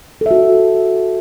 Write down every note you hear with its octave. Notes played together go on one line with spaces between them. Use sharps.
F#4 A4 E5